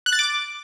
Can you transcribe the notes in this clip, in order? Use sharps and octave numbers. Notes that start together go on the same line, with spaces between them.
F#6
A6
D6